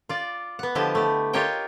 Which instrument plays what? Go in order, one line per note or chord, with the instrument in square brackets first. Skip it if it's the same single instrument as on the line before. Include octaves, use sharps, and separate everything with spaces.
[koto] F4 D5
B3 F#5
D3 F3 E4 G4 D#5
A3 G4
F4 G4 A#4 C#5 D#5 G5